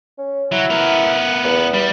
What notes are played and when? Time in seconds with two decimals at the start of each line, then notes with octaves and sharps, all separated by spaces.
0.18 C#4
0.52 F#3 E4
0.70 B3 A#4
1.45 E2
1.74 G3